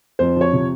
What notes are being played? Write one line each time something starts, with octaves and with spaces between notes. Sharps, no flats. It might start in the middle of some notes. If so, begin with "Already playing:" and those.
F2 C5
F3 C#5
C3